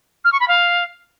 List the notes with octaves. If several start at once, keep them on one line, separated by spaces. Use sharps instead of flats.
F6
C#6
B5
F5